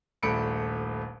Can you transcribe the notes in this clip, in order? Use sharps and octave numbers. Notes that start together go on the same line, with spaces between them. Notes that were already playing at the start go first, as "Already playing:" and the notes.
D#1 A#1 A3 B5 C#7 D7